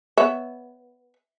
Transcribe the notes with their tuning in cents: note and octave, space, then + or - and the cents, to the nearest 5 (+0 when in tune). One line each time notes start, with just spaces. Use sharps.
B3 +0 C#5 +10 E5 +0